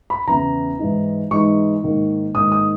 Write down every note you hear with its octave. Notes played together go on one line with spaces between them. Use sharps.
B5
E2 C#3 E3 B3 E4 A#5
G#2 E3 G#3 D#4
G#2 E3 G#3 D#4 C#6
G#2 D#3 A#3
G#2 D#3 A#3 D#6
D#6